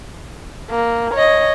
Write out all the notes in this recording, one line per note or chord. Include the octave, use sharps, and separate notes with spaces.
A#3
C#5 D#5